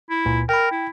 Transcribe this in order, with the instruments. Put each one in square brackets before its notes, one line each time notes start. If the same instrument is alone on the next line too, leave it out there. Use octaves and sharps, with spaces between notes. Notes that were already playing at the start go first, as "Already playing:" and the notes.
[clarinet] E4
[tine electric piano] C#2 A#2
[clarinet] A#4 [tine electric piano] G5 B5
[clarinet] E4